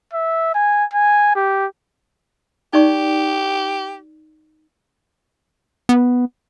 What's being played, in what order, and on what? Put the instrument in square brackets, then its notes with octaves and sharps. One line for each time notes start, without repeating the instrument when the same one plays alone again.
[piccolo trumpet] E5
G#5
G#5
G4
[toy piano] D#4 D5 C#6 [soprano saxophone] G4
[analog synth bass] B3